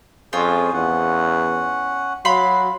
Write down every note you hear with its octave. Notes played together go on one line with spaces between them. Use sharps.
F2 C#4 F4 G#4 C5
E2 C#4 F#5
F#3 F5 B5 C6